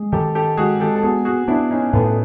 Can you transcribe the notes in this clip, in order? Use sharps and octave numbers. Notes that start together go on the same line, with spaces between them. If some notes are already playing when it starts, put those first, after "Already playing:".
Already playing: G#3 G#4
D#3 G4 A4
G4 A4
G#3 F#4 G#4
G4 A4
A4
B3 F#4 G#4
F#4 G#4
B3 D4 E4
C#4 D#4
A2 A3 B3